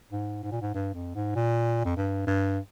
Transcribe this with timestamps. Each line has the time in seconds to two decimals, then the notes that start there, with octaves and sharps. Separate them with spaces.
0.12 G#2
0.43 G#2
0.51 A#2
0.61 G#2
0.74 G2
0.94 F2
1.15 G#2
1.36 A#2
1.85 F2
1.97 G2
2.27 G2